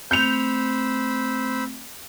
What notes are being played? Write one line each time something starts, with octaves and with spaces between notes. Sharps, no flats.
A3 C4 C5 B5 E6 G6 C#7 F7